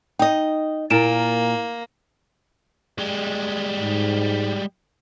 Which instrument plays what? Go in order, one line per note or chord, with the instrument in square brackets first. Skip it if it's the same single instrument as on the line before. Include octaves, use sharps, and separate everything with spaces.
[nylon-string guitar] D#4 D#5 [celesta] G5
[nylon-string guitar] A#2 [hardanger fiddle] A#3 [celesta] E4 D7 E7
[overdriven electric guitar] G3 G#3
[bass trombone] G#2